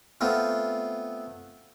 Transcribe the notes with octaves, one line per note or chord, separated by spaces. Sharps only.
A3 B3 C4 F4